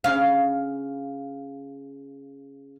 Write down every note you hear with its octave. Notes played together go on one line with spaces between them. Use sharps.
C#3 F5